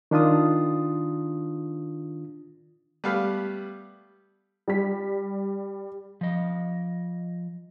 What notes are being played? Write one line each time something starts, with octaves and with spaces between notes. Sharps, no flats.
D#3 D4 F4 D#6
G3 A3 B3 F5
G3 B6
F3 D#5